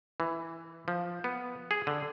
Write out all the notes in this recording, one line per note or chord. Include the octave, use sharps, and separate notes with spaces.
E3
F3
B3
G#4
D3